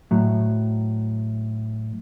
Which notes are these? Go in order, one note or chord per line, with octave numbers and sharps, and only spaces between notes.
A2 F#3